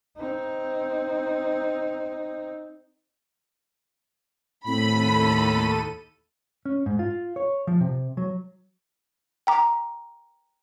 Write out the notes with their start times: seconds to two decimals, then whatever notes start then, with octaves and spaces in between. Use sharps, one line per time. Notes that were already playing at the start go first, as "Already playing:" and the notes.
0.17 C4 D#4
4.67 D#2 A2 C4 A4 B5 D#7
6.65 C#4
6.86 G#2
6.99 F4
7.36 C#5
7.67 F3
7.81 C3
8.17 F#3
9.47 G5 A#5 D6